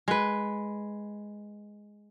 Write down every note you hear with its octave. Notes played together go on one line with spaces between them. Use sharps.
G#3 B4